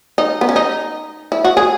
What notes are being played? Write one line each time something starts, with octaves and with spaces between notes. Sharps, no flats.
D#4
B3
C#4
D#4
E4
F#4
G#4